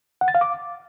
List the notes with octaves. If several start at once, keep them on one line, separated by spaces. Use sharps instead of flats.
F#5
A6
F5
D6